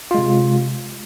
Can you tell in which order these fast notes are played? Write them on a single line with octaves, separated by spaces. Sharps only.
F4 G#3 C3